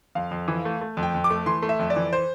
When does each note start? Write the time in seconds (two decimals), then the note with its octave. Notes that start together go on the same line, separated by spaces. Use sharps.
0.15 F2 F5
0.31 F2
0.48 E3
0.65 A3
0.81 A3
0.97 F2
1.03 G5
1.14 F2
1.24 D6
1.30 A3
1.46 E3 C6
1.62 A3
1.69 E5
1.79 F2
1.90 D5
1.96 E3
2.13 C5